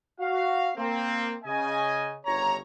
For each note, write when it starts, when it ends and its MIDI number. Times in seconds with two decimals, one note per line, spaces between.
0.20 0.71 66
0.20 0.71 77
0.76 1.35 58
0.76 1.35 60
1.44 2.16 49
1.44 2.16 75
1.44 2.16 80
2.25 2.57 31
2.25 2.57 49
2.25 2.57 73
2.25 2.57 82